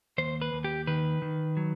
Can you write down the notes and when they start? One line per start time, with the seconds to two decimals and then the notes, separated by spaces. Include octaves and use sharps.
0.18 D#2 C5
0.42 B4
0.53 D#2
0.64 G4
0.87 D#3 B4
1.22 D#3
1.57 F#3